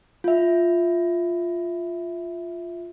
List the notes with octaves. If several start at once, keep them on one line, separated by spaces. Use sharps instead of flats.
F4 E5